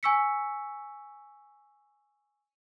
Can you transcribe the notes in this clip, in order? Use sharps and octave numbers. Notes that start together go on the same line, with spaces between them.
G#5 C#6 E6 B6 C#7